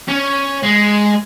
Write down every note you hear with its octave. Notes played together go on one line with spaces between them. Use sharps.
C#4
G#3